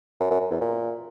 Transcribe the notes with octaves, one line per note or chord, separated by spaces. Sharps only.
F#2
F#2
F#2
E2
A#2